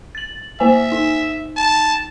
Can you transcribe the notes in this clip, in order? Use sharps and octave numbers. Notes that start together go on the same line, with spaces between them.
A6 F#7
A#3 C5 E5 G#5
D#4
A5